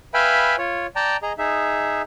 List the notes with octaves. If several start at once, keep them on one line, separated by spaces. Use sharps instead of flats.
B4 E5 F5 G5 G#5 B5
F4 C#5
D5 G5 A5 A#5
G#4 D#5 A#5
D#4 G#4 E5